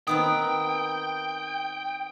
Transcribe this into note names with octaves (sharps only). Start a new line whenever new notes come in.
D#3 B3 C4 G5 D#6